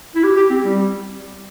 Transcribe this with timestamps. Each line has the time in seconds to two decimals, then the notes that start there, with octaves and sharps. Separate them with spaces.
0.15 E4
0.24 G4
0.36 G4
0.50 C4
0.63 G3